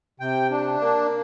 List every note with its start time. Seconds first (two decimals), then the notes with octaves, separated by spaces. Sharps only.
0.20 C3 G5
0.51 D4
0.81 A#3